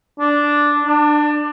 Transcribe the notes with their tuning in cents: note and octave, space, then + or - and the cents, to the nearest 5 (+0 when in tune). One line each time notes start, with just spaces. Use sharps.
D4 -5
D4 +20